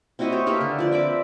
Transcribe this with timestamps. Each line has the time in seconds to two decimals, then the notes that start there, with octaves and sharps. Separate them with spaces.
0.19 C4 E4 F#4 D#5
0.32 G4 C5 C#5
0.46 A#3 G4 A4 B4
0.61 D3
0.79 F3 D5
0.91 C4 E5 B5 D6